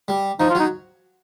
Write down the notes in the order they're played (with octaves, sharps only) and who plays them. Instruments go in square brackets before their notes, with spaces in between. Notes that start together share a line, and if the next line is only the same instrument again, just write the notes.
[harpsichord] G3
[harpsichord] F3 [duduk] D#4
[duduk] F4
[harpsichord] F#3 [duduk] D#4